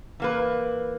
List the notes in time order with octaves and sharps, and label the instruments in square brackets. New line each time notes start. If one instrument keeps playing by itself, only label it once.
[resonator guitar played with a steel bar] E3 A#3 B4